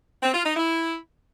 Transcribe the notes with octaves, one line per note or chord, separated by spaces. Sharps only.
C4
F4
D#4
E4